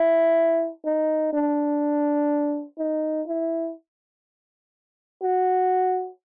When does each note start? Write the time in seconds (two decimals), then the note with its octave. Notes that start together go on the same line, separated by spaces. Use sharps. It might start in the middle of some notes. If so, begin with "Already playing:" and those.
Already playing: E4
0.85 D#4
1.33 D4
2.79 D#4
3.28 E4
5.22 F#4